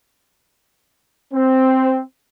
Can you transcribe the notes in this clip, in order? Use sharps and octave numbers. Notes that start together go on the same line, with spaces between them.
C4